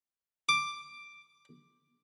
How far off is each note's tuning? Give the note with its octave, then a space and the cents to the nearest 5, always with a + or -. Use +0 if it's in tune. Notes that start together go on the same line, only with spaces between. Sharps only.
D6 +5